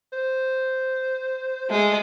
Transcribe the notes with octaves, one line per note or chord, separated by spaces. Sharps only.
C5
G#3 A3